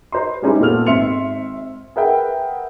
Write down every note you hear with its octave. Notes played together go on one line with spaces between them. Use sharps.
B4 C5 A#5 C6
G3 G#3 C#4 D#4 E4 G4
A#2 B3 A4 F6 F7
G#1 C4 E5 C6 C#7 F7
G#4 A#4 B4 E5 F#5 G5